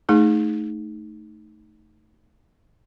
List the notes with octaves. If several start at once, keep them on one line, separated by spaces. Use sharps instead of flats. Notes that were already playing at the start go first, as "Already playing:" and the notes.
A3 D#4 G#4